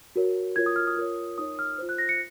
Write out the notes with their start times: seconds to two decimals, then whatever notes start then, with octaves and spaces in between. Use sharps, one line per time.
0.16 F#4 A#4 C#5
0.56 F4 A#4 C#5 G#6
0.66 D#6
0.76 F6
0.87 D#6
0.97 F4 A#4 C#5
1.38 D#4 A#4 C#5 D#6
1.59 F6
1.78 F4 C5
1.89 F#6
1.98 A#6
2.09 C#7